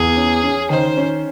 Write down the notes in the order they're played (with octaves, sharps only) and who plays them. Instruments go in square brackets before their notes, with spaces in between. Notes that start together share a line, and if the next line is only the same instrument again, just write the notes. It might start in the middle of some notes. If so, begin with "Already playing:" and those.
Already playing: [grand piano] E2 [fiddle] G#4
[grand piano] C#4
C#4
[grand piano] D#3 [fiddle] C5
[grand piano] C#4